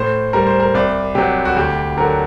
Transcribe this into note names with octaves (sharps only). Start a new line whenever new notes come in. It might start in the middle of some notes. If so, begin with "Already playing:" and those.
Already playing: A2 C5
G3 A#4
C5
A#4
C2 D5
C3 F#3 G4
F#4
D2 G4
D3 F#3 A#4